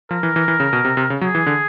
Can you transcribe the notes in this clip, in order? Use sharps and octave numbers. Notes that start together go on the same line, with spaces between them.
F3 A#4
E3
E3
E3
C#3
B2
C3
C3
C#3
F#3 G#4
E3
D3